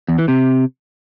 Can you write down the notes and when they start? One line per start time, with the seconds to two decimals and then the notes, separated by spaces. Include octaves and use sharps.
0.08 E2
0.18 E3
0.28 C3